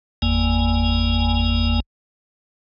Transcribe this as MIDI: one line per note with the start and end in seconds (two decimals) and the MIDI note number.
0.22 1.80 31
0.22 1.80 40
0.22 1.80 58
0.22 1.80 80